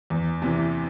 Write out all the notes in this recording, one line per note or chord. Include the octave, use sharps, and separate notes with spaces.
E2
C3 E3